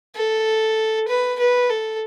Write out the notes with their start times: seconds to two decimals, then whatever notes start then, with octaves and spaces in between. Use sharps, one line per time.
0.15 A4
1.08 B4
1.39 B4
1.70 A4